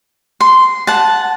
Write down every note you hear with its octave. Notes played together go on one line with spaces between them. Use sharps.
C6
F#5 A5